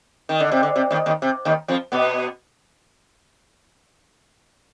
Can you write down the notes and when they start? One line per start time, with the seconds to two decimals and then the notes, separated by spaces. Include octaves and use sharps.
0.29 D#3
0.40 D3
0.52 C3
0.63 D3
0.76 C3
0.91 D#2 D#3
1.06 D#2 D#3
1.22 C3
1.45 D#2 D#3
1.68 F2 F3
1.92 B2 B3